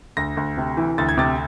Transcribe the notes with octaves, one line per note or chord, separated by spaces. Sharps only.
D2 A#6
D2
C3
E3
D2 A6
G#6
C3 A6